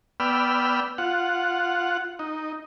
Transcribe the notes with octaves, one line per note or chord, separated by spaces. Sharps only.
B3 D5 G5 B5 E6 F6
F4 F#5
D#4